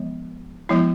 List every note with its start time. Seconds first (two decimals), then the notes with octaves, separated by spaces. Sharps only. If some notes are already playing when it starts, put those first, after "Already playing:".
Already playing: F3 G#3 B3
0.69 F3 G#3 B3 E4